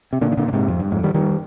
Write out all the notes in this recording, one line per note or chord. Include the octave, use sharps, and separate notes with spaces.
C3
A#2 D3
D#3
A#2 D3
D3
G#2 C3
F2
G2
F2 G#2
D#3 G3
D#3 G3